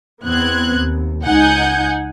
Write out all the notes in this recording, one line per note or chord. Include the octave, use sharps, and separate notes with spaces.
E2 B3 C4 F#6 G#6
D#2
C#2 D#4 F#5 G#5 G6